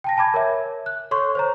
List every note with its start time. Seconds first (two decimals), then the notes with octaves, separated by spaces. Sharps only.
0.04 G5 A5 A#6
0.17 G#5 A5 B5 D6 G#6
0.34 A#4 C#5 E5
0.86 F#6
1.11 A4 C#5 C6 C#6
1.35 C5 C#5 A#5